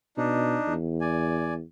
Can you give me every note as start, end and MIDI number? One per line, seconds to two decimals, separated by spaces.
0.17 0.57 47
0.17 0.73 62
0.17 0.73 63
0.67 1.62 40
1.01 1.54 74
1.01 1.54 80